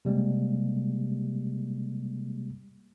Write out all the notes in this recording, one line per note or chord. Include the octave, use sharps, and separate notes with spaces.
C3 G3 G#3 A#3